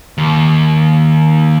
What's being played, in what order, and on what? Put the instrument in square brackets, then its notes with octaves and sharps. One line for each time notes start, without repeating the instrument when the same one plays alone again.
[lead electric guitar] D#2